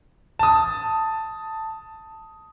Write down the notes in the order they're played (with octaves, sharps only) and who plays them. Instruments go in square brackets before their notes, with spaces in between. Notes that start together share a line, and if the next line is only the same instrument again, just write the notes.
[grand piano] A5 D#6